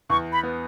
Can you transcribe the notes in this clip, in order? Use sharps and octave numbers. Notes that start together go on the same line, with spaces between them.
E2 C#6
B5
B3